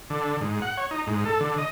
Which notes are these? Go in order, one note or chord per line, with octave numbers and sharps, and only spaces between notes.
D3
G#2
F#5
C#5
D#4
G#2
A4
D3
D#5